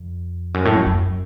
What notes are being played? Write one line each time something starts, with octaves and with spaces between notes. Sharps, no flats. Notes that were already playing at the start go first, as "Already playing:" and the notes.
Already playing: F2
F#2
A2
F#2
F#2